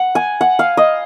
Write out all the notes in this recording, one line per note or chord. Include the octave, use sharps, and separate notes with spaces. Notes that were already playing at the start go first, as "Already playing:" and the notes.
Already playing: F#5
G#5
F#5
F5
D#5